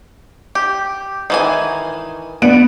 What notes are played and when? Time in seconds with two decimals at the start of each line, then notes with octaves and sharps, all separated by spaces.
0.55 G4
1.30 D#3 E3 G#5
2.42 B3 D4 F#5 D7